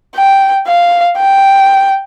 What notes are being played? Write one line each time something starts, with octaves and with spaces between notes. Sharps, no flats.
G5
F5
G5